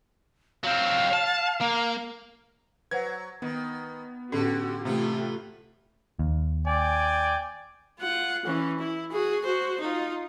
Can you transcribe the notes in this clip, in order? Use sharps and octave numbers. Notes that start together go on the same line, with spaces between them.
F#3 C4 F5
A5
A#3
F#3 B4 C5 F#5 G#6
D#3 B3
A2 D3 C#4 F#4 G4 A4
C3 E3 A3 B3 F4 G4
D#2
D5 G5 G#5
F4 F#5
E3 C#4
E4
F#4 G#4
F#4 C5
D#4 F4